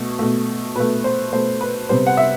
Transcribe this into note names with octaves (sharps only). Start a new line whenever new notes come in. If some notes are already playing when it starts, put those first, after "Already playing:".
Already playing: B2 A3
B2 A3
B2 A3 B4
C5
B2 A3 C5
B4
C3 G3 B3 C5
F#5
E5